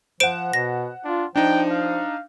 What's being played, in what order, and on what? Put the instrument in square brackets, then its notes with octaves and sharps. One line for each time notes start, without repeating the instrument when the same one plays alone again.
[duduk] F3 [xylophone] C5 D7 [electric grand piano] F#5 E7
[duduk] B2 [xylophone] A#6
[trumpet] D4 [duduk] F4
[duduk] F3 [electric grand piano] D4 D#4 [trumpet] G5
[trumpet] F5